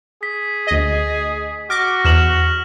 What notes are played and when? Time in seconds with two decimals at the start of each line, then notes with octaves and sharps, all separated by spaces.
0.23 G#4 B6
0.67 D2 D#5
1.70 F#4 D6 F6 A#6
2.05 E2 F6 E7 F#7